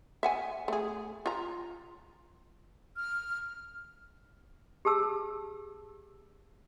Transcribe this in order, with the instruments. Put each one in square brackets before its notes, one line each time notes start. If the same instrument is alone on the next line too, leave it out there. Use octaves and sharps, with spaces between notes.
[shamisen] E5 F#5 G#5
A3 G#4
F4 A#5
[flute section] F6
[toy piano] G4 G#4 A5 E6